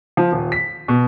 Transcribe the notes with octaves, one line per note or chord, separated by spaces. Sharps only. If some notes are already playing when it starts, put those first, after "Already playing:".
F3
D#1
B6
B2